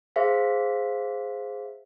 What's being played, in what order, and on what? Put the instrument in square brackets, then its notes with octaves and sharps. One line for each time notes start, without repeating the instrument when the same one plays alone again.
[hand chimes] G#4 C5 E5 F5 B6